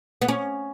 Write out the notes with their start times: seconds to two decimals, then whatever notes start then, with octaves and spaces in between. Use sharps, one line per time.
0.22 B3
0.28 C#4